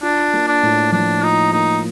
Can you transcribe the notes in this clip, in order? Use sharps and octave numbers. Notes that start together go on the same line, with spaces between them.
D4 F4
A#3
D4
A2
F3 D4
D#4 F4
A#3 D#4